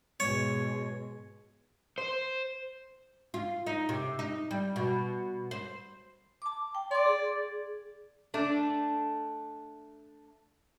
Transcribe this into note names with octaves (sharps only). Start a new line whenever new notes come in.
G#2 B2 G#3 C#5
C5
F4
D#4
C3
D#4
G3
B2
C5
A5 D6
G5
D5 C6 D6
G#4
A3 D4